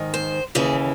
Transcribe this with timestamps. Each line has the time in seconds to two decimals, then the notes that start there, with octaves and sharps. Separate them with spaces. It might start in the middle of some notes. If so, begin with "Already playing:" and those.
Already playing: G#2 D#3
0.14 C5
0.55 D#2 C#3 E3 G#4